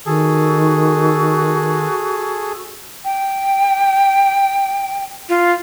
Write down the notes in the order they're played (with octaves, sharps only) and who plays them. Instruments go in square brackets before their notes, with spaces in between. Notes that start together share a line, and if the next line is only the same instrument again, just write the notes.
[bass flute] D#3 [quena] F#4 [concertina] G#4 A4
[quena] G5
F4